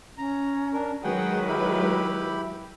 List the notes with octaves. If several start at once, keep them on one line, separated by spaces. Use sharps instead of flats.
C#4 A#5
D4 A#4
D#3 F#3 G#3 G#4 B4 F#5 G5
E4 G4 B5